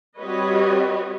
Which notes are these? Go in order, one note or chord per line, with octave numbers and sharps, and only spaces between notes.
G3 C4 F#4 B4 C#5 D#5